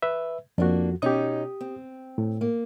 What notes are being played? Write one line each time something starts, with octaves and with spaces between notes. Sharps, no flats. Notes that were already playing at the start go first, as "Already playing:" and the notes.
B4 E5
F2 A#3 D4 F#4
B2 C#4 D#4 G4 D#6
C4
A2
A#3